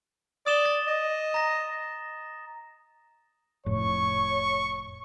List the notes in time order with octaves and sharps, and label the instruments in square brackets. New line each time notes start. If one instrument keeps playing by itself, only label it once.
[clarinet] D5 [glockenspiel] D#6 E7 G7
[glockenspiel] A6
[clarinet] D#5
[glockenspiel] A#5 A#6
[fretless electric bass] F1 A2 [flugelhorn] C#5 [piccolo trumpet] C#6